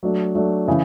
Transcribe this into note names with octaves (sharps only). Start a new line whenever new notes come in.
F#3 A3 D4
F#3 A3 D4
C#3 E3